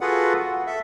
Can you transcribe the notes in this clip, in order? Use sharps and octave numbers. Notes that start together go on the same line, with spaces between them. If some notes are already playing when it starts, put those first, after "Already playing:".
F4 F#4 G#4 A4 B4 F#5
F#4
A4 E5